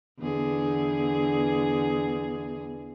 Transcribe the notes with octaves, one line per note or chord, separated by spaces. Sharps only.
E2 D3 G#4